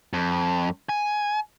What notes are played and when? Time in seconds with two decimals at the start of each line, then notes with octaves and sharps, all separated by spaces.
0.13 F2
0.89 G#5